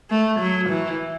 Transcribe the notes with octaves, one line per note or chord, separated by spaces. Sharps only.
A3
F#3
E3